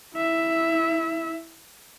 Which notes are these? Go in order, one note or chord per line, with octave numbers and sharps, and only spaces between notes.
E4 E5